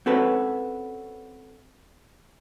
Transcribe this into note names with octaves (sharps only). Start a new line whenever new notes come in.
C4 C#4 F#4 A4 B4